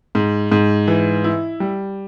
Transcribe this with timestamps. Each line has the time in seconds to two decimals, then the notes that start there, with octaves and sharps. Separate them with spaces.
0.15 G#2
0.52 G#2
0.88 E3
1.24 E4
1.60 G3